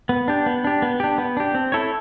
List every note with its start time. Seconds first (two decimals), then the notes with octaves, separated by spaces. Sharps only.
0.09 B3
0.28 D4 G4
0.46 B3
0.64 D4 G4
0.82 B3
1.00 D4 G4
1.18 B3
1.37 D4 G4
1.55 C4
1.72 E4 A4 C#5